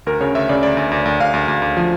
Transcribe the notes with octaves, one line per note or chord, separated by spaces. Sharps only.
D2 A#4
C#3 C#5
D2 E5
C#3 D5
D2 D5
D2
D2
D2
D2 F5
D2
D2
D2
F3